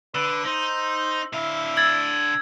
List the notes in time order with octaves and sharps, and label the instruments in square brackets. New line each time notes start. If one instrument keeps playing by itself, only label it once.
[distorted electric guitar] D3 [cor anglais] B4 [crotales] E6
[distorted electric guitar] D#4 [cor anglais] C5
[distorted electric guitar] D3 F5 [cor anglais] E4
[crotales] E6 G#6 A6